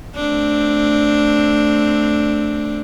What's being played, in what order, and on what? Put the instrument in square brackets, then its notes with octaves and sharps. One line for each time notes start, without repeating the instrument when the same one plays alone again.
[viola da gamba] A3 C4 D4